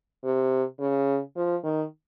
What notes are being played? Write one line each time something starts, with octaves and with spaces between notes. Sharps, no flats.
C3
C#3
F3
D#3